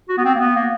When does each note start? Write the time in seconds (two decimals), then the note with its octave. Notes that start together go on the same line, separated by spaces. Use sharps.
0.09 F#4
0.18 B3
0.25 C4
0.35 A#3
0.40 B3
0.56 A#3